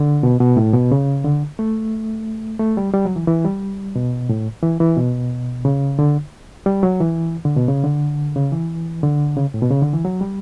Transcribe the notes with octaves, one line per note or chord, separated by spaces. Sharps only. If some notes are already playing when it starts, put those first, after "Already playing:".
Already playing: D3
B2
B2
A2
B2
C#3
D3
A3
A3
G3
G3
F#3
E3
E3
G3
B2
A2
E3
E3
B2
C#3
D3
G3
F#3
E3
D3
B2
C#3
D3
C#3
E3
D3
C#3
A2
B2
C#3
D3
E3
F#3
G3